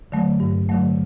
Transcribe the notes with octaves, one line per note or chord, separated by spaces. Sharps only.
D3 F#3 A3
G2
D3 F#3 A3